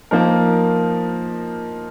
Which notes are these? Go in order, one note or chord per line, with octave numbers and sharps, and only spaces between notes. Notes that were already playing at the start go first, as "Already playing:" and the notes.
F3 A#3 D#4 A#4